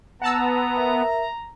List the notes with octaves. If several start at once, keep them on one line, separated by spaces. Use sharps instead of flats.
B3 F#5 A5 A#5 E6
A#4 E5